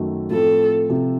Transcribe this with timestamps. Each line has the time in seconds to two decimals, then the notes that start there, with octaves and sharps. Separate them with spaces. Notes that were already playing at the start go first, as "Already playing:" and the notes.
Already playing: F#2 D#3 F#3 A3
0.31 A2 F3 A3 C4 A4
0.90 C3 F3 C4